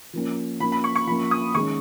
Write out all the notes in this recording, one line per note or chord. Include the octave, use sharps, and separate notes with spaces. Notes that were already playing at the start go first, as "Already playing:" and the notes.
F3 A#3 C#4
F3 A#3 C#4 B5
B5
C#6
C#6
F3 A#3 C#4 B5
D#6
D#3 G#3 C#4 C#6